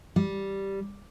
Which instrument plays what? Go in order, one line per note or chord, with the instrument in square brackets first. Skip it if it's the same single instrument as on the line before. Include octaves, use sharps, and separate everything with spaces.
[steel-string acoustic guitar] G3